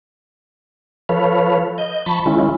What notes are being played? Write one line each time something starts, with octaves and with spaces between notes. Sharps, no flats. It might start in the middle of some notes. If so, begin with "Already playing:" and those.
F3 A4 B4 C#5 F5
D#5 G6
F3 A5 B5 C#6
D#3 G#3 C#4 E4 F4